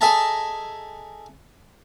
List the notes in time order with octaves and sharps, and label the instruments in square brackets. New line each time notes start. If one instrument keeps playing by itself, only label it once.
[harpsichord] G#4 A4 D#5 E5 A5 A#5